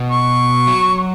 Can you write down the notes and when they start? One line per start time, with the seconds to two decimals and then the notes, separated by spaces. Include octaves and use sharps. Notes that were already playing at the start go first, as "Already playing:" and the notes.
Already playing: B2
0.11 C#6
0.67 F#3